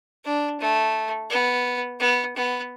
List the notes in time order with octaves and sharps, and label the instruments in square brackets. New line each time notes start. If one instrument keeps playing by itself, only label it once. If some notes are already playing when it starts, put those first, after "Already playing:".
[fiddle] D4
A3
B3
B3
B3